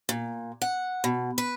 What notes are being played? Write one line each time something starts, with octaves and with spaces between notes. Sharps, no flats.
A#2
F#5
B2
B4